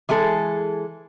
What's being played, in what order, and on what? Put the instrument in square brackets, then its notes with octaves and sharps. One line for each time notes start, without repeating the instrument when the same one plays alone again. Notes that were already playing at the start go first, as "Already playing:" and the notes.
[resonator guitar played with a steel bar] E3 G#3 G#4 A4